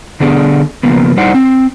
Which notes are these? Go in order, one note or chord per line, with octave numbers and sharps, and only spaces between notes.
D3 B3 D4 G#4 A4 D5
C#3 F3 A#3 B3
G3 D#4 E4 C5 D5 F#5
C4